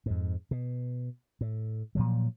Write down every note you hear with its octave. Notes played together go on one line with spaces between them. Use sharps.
F2 G#2
B2
A2
A#2 F3 F#3